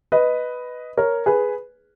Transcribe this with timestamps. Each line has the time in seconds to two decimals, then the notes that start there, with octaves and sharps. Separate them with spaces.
0.12 B4 D#5
0.97 A#4 C#5
1.26 G#4 B4